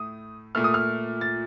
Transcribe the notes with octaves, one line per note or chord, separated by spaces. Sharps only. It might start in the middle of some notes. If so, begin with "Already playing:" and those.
Already playing: A2 A3 D#6
A#2 A3 F6
D#6
F6
A6